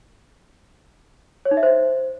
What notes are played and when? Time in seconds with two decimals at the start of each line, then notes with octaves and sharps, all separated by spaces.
1.45 C#5
1.51 D#4
1.57 E5
1.63 C5